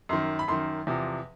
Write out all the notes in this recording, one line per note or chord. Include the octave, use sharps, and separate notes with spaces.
F#2 D#3 C6
B5
F#2 D#3 C6
E2 C3 F3